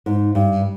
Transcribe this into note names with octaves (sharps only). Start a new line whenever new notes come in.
G#2
G2